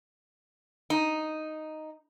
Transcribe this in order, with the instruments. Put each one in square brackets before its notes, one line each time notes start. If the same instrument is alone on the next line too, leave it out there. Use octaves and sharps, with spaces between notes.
[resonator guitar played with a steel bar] D#4